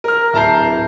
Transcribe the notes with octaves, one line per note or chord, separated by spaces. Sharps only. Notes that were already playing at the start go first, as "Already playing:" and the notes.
A#4 F6
D1 E4 A5 A#5 G6 C7